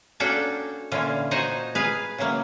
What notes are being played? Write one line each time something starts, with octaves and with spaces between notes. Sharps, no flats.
A#3 C#4 D4 F#4 A4 G5
A#2 D3 E3 C#4 F4
D#4 F#4 C5 C#5 D#5
G#4 B4 F5
C#3 E3 F#3 A#3